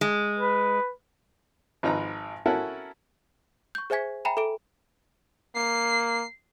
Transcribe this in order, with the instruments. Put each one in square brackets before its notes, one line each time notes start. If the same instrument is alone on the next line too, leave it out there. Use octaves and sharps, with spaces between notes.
[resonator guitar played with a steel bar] G#3
[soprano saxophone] B4
[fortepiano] G#1 F3 D#4 B4 A#5
C#4 E4 F#4 A4 A#4
[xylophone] C#6 G6
G#4 C5 E5 G#5 G#6 B6
E5 G5 G#5 A#5 B5
A4 E5 D6 D7
[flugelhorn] A#3 [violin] C7